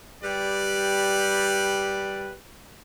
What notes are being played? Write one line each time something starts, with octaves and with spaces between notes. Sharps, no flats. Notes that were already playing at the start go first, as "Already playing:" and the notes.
G3 G4 B4 D5